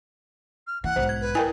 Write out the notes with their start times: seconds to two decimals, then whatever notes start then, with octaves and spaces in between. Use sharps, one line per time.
0.67 F6
0.84 E3 F#5
0.96 B1 G#2 C5
1.09 G#6
1.21 B4
1.35 E4 A#4 G5 G#5